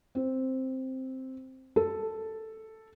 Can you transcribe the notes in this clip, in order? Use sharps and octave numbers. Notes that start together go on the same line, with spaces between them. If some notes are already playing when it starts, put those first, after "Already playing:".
C4
A4